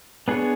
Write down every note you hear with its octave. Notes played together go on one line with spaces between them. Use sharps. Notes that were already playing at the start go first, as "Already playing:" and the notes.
B3 D4 G#4 C#5